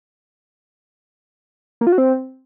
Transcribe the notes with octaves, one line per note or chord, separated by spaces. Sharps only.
A#3
F4
F#4
C4